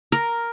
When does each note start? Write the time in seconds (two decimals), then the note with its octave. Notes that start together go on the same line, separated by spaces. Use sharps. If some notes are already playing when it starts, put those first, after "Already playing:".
0.12 A#4